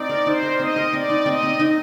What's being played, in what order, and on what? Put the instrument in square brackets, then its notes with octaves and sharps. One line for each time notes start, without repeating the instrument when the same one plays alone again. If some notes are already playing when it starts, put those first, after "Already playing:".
Already playing: [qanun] C4 D#4 [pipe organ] D5
[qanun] A#4
[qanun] D#4 [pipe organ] C5
[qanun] A#4
[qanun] C4 [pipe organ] D#5
[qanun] A#4
[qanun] C4 [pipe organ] D5
[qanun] D#4
[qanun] C4 [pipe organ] D#5
[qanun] C4
D#4